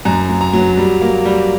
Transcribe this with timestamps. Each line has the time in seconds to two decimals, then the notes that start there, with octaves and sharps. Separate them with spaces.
0.05 F#2 A#5
0.29 F#3
0.41 A#5
0.53 F#3
0.77 G3
1.01 A#3
1.25 G3